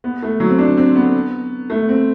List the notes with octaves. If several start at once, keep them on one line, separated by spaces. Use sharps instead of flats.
B3
A3
F#3
C4
D4
C4
B3
A3
C4